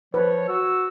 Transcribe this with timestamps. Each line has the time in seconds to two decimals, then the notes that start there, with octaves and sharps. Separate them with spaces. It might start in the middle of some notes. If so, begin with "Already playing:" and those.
0.14 F3 B4 C#5
0.48 F#4 E6